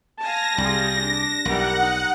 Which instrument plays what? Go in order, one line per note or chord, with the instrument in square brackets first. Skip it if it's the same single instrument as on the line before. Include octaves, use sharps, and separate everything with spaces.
[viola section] F5 G#5 A5 [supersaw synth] A#6
[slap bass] C2 [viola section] G3 F4 G#4
[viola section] D4
[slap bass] B1 [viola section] E3 G3 A#4 [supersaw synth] F#5
[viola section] D#4